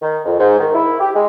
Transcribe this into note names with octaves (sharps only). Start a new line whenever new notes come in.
D#3
F2
G#2
D#3
E4
G4
G#3